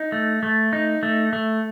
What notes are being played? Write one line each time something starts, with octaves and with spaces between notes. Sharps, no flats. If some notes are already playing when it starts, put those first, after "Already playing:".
Already playing: D#4
A3
A3
D#4
A3
A3